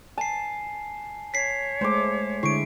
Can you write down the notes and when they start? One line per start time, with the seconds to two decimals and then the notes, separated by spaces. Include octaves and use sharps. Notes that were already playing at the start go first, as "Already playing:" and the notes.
0.18 G#5 A5 C7
1.34 C#5 B6 C7
1.81 G#3 A3 C5 D6
2.43 D3 G#3 E4 C#6 C7 D7